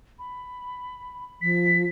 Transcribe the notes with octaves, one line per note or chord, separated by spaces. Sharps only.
B5
F3 B6